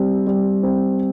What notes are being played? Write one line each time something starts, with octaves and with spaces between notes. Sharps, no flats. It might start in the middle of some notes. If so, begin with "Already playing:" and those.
Already playing: G3 C4
G3
C4